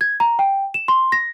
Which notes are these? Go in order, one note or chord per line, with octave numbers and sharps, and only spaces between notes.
G#6
A#5
G5
E7
C6
A#6